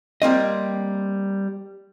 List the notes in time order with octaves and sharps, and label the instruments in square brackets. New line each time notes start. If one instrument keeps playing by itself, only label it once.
[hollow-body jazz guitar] G3 A#3 C4 D#5